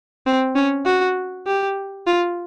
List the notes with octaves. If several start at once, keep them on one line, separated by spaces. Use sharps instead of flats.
C4
C#4
F#4
G4
F4